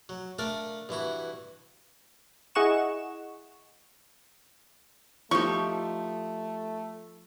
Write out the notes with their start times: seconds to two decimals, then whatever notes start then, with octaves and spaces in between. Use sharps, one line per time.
0.09 F#3
0.39 A3 D4 A#4 D5 F5
0.89 G2 E3 E4 F#4
2.55 E4 G#4 D#5 F#5 C#6 E7
5.31 F3 A3 D#4 G4 C#6